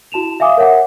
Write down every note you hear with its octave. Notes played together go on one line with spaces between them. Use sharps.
E4 F#4 A5 E7 F7
E5 F5 G#5 D6 D#6
A#4 C#5 E5 F#5